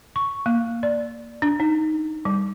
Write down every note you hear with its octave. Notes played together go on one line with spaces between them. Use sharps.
C#6
A#3
D5
D4
D#4
G3